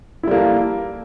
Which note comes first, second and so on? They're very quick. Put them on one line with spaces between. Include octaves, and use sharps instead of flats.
E4 G3 A#3 A4